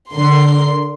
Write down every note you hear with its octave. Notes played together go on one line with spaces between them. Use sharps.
D3 A#4 C6